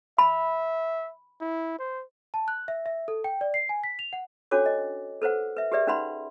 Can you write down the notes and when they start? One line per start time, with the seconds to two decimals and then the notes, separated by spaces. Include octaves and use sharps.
0.19 E5 B5
1.41 E4
1.79 C5
2.34 A5
2.48 F#6
2.68 E5
2.86 E5
3.08 A4
3.24 G5
3.41 D5
3.54 C7
3.69 G#5
3.84 B6
3.99 F7
4.13 F#5
4.51 C#4 D4 F#4 A4 C#5 D6
4.66 D#5
5.22 A4 B4 C5 F#5
5.57 B4 E5
5.72 G4 G#4 B4 D5 E5
5.87 C#4 D#4 B4 F#5 B5 C6